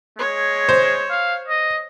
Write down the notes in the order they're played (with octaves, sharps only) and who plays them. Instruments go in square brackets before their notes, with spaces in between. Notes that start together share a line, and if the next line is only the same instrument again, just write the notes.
[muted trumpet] G#3 [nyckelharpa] C#5
[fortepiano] C5
[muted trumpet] F5
D#5